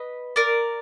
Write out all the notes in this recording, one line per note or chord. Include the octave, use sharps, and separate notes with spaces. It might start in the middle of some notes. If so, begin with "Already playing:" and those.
Already playing: B4 D#5
A#4 D5